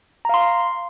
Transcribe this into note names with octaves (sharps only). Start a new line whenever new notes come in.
F5 A#5 C6